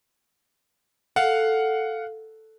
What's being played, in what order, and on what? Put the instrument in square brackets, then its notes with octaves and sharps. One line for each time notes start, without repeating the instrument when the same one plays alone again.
[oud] A4 [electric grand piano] F5 F#5